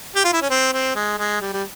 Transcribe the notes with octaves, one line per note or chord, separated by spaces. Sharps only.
G4
F4
E4
C#4
C4
C4
G#3
G#3
G3
G3